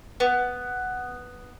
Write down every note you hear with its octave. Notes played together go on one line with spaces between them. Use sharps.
B3